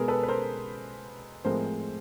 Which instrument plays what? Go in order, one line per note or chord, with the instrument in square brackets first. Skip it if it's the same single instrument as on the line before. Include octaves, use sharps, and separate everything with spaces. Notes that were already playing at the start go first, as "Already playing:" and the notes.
Already playing: [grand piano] B2 G#3 B3 G#4 A#4
A4 B4
B4
A#4 C5
A2 F3 G#3 C4 A#4 C5